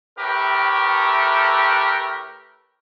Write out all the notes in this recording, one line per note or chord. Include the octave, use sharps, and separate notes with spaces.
A2 A3 G4 A#4 B4